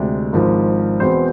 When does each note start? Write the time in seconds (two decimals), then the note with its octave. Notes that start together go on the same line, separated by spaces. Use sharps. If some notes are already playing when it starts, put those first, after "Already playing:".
Already playing: D2 C3 G#3 D4 D5
0.33 G#1 G#2 F3
1.00 E1 E2 B2 B3 C4 C5